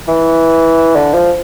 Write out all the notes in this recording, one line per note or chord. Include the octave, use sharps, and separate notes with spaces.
E3
D3
F3